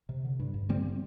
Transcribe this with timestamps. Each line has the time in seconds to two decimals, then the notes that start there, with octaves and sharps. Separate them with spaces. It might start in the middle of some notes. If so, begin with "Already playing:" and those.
0.09 C3
0.24 D3
0.40 G2
0.54 G2
0.69 D3 G3 C4
0.85 D3